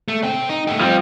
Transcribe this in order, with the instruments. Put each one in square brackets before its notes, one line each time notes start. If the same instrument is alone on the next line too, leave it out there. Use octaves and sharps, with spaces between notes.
[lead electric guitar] A3
C3 G5
D#4
A3 G4
[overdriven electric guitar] F3 C4 [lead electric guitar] G3